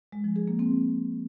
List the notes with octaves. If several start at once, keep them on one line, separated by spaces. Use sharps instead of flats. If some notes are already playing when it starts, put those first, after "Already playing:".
G#3
F3
G#4
A#3
C4